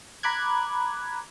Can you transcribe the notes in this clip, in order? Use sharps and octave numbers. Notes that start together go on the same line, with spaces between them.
A#5 B5 D6 F#6 G#6